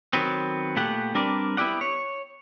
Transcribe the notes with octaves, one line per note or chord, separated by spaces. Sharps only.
D#3 F#3 B3 C4
A#2 A3 B3 G4 F#5
G3 C4 D4 A#4 B4 D5
B3 E4 F4 G4 D5 F#5
C#5